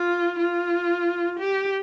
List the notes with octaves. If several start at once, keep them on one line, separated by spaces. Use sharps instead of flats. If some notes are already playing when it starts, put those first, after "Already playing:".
Already playing: F4
F4
G4